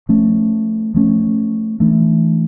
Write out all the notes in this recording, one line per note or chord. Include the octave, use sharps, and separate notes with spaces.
F3 A3 C#4
F3 A3 C#4
E3 A3 D4